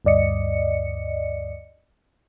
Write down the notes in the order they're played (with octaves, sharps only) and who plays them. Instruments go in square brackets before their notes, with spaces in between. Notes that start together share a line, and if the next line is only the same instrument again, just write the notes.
[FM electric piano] D2 G2 D5 D#5 C#7